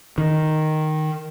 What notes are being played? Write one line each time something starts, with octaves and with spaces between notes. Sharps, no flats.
D#3